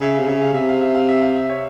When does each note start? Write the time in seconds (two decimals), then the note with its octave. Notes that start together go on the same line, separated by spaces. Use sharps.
0.01 C#3 E5
0.15 C3 F5
0.27 C#3 E5
0.42 F5
0.53 C3 E5
0.69 F5
0.81 E5
0.95 F5
1.09 E5
1.22 F5
1.36 E5
1.49 C#5